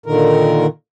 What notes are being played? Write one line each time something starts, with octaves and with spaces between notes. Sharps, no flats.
A#2 D3 D#3 A#4